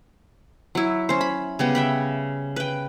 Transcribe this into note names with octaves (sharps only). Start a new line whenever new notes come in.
F#3 E4
C#4 C5
B5
C#3 G3 B3
E5 G5 B5
B4 G5